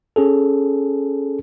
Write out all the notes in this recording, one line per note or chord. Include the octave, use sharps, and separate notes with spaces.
C#4 G#4 A4